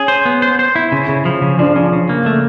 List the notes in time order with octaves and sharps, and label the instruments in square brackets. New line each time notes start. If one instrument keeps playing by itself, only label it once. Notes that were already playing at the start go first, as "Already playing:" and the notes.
Already playing: [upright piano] C#4 [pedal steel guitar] G#4
[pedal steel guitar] C5
B3
C5
C5
E4
C#3
C#3
F3
C#3
[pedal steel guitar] F3 [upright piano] D4
[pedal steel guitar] C#3
C#3
A#3
A3